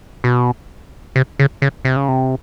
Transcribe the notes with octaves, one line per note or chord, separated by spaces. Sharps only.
B2
C3
C#3
C#3
C3
C#3
C3